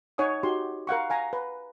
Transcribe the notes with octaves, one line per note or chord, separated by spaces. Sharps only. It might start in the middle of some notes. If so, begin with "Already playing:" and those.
D#4 C#5 F#5 G#5 D#6
D#4 F#4 G4 C6
A#4 F5 F#5 C#6
F5 G#5 A#5
B4